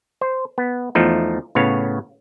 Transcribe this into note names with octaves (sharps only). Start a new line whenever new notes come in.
C5
B3
E2 F3 A3 D#4
A2 C#3 B3 C#5 F5